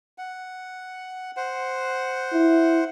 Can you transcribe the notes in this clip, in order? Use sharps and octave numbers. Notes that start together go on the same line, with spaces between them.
F#5
C5 F#5
E4